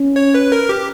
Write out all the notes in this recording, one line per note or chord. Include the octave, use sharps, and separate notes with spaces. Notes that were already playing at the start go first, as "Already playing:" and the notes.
Already playing: C#4
C#5
B4
A#4
G4